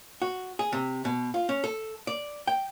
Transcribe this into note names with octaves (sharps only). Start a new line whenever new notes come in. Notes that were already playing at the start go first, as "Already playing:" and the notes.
F#4
G#4
C3
B2
F4
C#4
A4
D5
G5